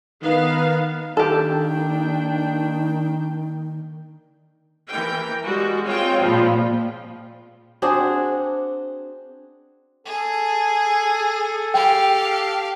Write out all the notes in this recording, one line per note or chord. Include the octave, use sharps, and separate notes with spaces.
D#3 B3 D#4 F5
D#3 A#3 D4 G4 A4 G5
E3 A#4 G5
G3 G#3 F#4
G#3 C4 F4 C#5 G5
A#2 F3 G3
C4 D4 F#4 G#4
G#4 A4
G4 F5 G5